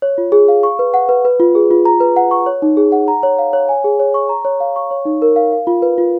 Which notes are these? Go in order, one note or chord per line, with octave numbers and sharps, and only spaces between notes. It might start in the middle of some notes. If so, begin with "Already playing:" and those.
C#5
F4
G#4
F5
C#6
B4
F#5
B4
B4
F4
G#4
F4
A#5
B4
F#5
C#6
C#5
D#4
G#4
F#5
A#5
C#5
F5
C#5
G#5
G#4
C#5
C#6
A#5
C#5
F5
C#6
C#5
D#4
A#4
F5
F5
F4
B4
F4